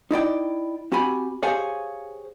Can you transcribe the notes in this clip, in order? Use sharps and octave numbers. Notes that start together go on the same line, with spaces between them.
D#4 E4 D5 G5
C4 F#4 G4 G#5 B5
G4 G#4 C5 C#5 F5 G#5